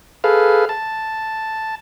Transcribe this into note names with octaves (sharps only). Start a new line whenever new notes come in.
G#4 A4 B4 F5
A5